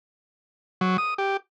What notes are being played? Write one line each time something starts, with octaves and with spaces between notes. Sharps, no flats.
F#3
D#6
G4